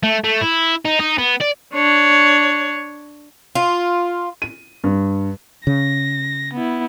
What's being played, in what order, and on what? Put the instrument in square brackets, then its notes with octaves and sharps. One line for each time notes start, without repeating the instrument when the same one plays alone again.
[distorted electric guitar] A3
A3
E4
D#4
D#4
B3
D5
[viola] D4 C#5
[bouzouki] F4
[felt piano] D#7
G2
[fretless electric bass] C#3 [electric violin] A#6
[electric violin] B3 E4